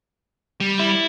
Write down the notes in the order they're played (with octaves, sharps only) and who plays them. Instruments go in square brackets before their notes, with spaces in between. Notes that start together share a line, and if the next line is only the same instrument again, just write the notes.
[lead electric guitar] G3
[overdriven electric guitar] E4